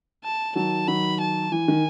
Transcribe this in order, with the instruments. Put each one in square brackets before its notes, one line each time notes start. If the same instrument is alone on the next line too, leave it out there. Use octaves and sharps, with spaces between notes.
[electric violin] A5
[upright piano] D#3 F#3 [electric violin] A5
[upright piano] D#3 F#3 [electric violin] B5
[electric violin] A5
[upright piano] E3 [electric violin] G#5
[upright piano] D#3